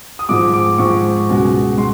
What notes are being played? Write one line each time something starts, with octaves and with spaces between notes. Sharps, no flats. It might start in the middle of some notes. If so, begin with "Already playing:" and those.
D#6
G#2 F3 G#3 D6
D6
G#2 F3 G#3 C#6
C#2 B2 G#3
G#3 C6